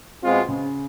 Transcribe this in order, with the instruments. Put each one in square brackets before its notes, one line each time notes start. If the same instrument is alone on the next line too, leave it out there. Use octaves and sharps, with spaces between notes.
[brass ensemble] B2 G#3 C4 F4
[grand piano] C#3